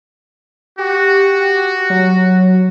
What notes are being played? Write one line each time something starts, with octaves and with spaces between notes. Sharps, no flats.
F#4 G4
F#3